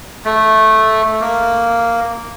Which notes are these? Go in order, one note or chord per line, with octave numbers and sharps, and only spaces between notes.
A3
A#3